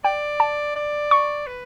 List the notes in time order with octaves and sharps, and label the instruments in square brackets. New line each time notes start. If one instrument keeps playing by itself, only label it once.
[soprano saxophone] D5 [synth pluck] G5
[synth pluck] A5
[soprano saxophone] D5
[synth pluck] C#6
[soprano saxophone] B4